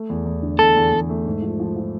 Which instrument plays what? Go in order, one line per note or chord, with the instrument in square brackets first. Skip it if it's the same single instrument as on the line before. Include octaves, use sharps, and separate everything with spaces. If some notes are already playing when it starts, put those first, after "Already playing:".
Already playing: [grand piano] A3
E2
E2
D3
[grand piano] E2 [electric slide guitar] A4
[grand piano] E2
E2
A3
G#2
F3
F3
F3